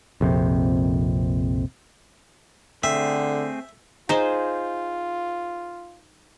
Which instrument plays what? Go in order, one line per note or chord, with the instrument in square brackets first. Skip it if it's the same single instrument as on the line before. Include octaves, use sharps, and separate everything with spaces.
[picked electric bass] A#1 F2 C3
[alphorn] D3 [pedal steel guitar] A3 C4 G#4 [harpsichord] E5
[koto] D#4 [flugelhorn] F4 [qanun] G#4 C5